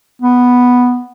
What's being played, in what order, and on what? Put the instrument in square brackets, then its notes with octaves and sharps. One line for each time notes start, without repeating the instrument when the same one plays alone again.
[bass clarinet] B3